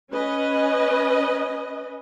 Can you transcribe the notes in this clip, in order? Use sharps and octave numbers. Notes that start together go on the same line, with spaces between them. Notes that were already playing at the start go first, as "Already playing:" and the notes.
C#4 B4 D#5